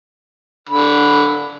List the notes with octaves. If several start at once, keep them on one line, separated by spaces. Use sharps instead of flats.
D3 B5